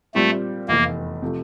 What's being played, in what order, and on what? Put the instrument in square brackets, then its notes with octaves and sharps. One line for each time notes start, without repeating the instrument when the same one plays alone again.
[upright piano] A#2 G3 C4 G4 [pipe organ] A3
[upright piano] F1 E2 E3 [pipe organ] A#3
[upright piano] C3 F3 A3